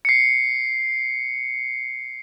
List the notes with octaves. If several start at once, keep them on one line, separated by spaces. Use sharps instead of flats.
C7 C#7